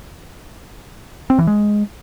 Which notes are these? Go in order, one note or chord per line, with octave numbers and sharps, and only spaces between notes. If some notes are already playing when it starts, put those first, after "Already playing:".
C4
E3
G#3